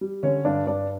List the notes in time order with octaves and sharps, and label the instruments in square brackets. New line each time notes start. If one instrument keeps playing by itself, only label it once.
[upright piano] G3
D3 C#4 C#5
G2 D4 D5
G2 D4 D5